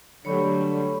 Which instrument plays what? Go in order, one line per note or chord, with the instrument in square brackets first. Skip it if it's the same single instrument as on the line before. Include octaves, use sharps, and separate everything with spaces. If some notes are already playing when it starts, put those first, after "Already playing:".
[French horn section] D3 [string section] F#3 G3 A3 [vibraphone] C#5 B5 C#6